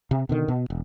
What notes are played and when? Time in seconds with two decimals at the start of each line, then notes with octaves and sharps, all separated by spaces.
0.11 C3
0.29 B2 D3 D#3
0.48 B2
0.70 E1